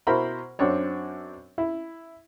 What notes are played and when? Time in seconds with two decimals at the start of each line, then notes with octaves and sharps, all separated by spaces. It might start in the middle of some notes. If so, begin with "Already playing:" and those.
0.07 B2 E4 A#4 C5 B5
0.59 F#2 C4 D4 C#5
1.58 E4